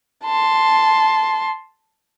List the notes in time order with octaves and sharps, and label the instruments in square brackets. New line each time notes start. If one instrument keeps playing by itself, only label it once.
[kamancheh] A5 C6